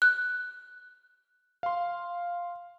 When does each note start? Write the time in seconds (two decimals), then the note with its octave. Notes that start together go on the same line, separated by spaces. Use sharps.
0.02 F#6
1.63 F5 C6